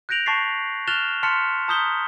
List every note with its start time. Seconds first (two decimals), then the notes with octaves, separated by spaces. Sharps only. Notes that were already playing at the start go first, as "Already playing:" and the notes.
0.09 F#6 G6 A#6 D7 F7 F#7
0.26 A5 C#6 A6 B6 C7
0.87 F6 F#6 A6 E7 F7 G7
1.23 A5 C6 F6 A6 B6 C#7
1.68 A5 A#5 D#6 G6 B6 G7